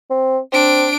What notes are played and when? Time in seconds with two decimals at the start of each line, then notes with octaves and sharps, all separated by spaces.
0.10 C4
0.52 C4 D4 D7